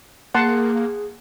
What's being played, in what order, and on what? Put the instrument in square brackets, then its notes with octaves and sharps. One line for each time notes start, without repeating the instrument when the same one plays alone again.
[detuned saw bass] A#3 [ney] G#4 [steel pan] F#5 A5 C6